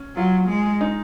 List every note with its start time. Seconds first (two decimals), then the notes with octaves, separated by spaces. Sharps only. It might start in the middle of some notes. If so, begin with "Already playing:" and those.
Already playing: C#4
0.16 F#3 F4
0.49 G#3
0.81 D#4